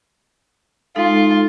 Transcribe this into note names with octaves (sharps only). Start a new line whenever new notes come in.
G#3 D#4 F4 A4